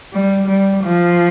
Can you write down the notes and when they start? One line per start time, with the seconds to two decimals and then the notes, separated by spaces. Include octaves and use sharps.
0.13 G3
0.48 G3
0.84 F3